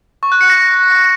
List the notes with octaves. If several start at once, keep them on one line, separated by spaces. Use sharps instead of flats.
C#6
F#6
C#7
A#6